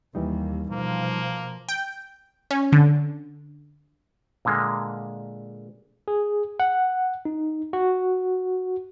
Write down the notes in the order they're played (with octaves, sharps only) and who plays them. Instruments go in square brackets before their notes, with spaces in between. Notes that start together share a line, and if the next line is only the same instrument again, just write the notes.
[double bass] D#2 A#3 [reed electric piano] E3 G3 D#4
[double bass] B2 F3 [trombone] A#3
[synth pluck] G5
C#4
D3
[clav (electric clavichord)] A#2 D3 G#3 A#3
[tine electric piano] G#4
F#5
D#4
F#4